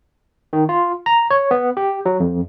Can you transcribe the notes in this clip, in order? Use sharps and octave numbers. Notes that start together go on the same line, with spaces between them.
D#3
F4
A#5
C#5
B3
G4
F#3
F2